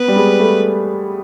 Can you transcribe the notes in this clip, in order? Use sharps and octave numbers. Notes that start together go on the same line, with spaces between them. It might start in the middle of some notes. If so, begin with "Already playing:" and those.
Already playing: B3 B4
G3
G#3
A3